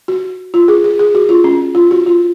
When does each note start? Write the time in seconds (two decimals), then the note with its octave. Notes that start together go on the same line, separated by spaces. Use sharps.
0.08 F#4
0.54 F4
0.68 G#4
0.84 G#4
0.99 G#4
1.15 F#4
1.29 F4
1.44 C#4
1.75 F4
1.91 F#4
2.06 F4